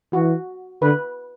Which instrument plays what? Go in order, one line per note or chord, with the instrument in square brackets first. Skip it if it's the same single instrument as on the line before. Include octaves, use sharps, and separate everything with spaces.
[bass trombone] E3 [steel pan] F#4
[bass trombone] D3 [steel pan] B4